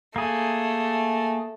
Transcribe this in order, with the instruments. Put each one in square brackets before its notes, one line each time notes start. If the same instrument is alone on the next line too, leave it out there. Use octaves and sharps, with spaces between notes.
[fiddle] A3 [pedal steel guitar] A#3 G#4